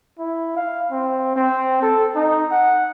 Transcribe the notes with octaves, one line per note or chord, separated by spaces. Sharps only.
E4
F5
C4
C4
A4
D#4
F#5